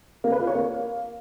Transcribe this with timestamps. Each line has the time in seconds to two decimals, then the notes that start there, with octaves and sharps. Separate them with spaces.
0.24 A#3
0.32 B4
0.40 F4
0.47 C#5
0.55 A#3